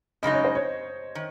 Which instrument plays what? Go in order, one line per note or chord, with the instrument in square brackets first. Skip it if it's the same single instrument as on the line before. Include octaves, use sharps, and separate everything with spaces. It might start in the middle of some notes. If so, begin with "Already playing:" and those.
[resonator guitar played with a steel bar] F#2 C#3 G#3 D#4 [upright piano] D#5
[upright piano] C#5
C5
C#5
[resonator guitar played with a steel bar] D#3